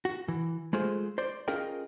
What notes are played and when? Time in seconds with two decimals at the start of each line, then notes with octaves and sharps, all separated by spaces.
0.05 F#4
0.28 E3
0.73 G#3 A3 F4 G#4 C5
1.18 C5 D5
1.48 C#4 F4 G#4 A#4 D#5 G5